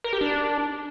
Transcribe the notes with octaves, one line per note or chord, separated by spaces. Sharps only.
A#4
G4
D4